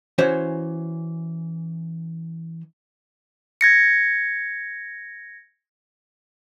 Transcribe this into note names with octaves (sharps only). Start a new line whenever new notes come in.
E3 C#4 F#4 C5 C#5 E5
G#6 A#6 C#7